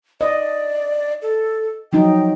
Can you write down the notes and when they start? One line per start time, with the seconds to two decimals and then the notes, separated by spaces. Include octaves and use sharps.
0.21 D5 D#5
1.22 A4
1.93 F3 F#3 D#4 G5